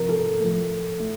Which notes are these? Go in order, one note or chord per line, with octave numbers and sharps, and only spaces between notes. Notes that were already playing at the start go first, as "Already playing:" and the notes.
Already playing: C3 F3 A#4
A4
A2 F3
A2